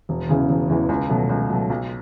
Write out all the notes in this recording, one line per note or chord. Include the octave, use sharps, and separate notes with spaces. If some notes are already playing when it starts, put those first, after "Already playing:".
E1
E2 C#3 E3
E1
E2 C#3 E3
C#2
B2 F#3 A3
C#2
B2 F#3 A3
B1